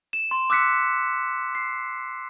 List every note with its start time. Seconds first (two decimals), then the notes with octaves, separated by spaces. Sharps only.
0.13 E7
0.31 C6
0.50 D6 E6 F#6 B6 C#7
1.55 C7